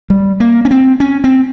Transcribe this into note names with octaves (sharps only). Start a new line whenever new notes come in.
G3
A#3
C#4
C4
C#4
C4